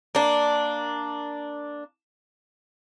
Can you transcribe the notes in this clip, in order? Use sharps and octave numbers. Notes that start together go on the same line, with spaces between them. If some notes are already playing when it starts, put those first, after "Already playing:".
A#3 D4